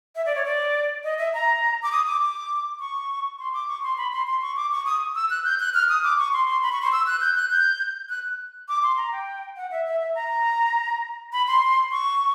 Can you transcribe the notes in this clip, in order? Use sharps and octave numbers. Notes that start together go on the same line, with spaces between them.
E5
D5
C#5
D5
D#5
E5
A#5
D6
D#6
D6
D6
C#6
C6
D6
C#6
C6
B5
C6
C6
C#6
D6
C#6
D#6
E6
F#6
G6
F#6
F6
D#6
D6
C#6
C6
C6
B5
C#6
C6
E6
F#6
G6
F#6
G6
F#6
D6
C6
A#5
G5
F#5
E5
E5
E5
A#5
B5
C6
C#6